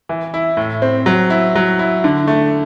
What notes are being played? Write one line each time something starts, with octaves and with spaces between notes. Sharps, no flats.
E3
E4
A2
C4
F#3
E4
F#3
E4
D3
A3